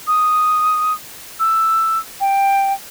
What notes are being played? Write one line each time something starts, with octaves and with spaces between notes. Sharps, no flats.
D#6
E6
G5